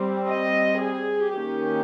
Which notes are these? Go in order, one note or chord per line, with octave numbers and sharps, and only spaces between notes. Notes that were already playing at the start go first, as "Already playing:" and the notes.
Already playing: G3 C4
D#5
G#4
D#3 A#3 C#4 G4